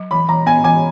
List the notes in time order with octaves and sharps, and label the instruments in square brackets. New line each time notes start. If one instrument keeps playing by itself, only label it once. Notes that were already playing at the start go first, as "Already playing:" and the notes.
Already playing: [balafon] F#3
[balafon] E3 [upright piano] B5
[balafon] E3 [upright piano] A#5
[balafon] B3 [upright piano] G#5
[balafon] E3 [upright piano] G#5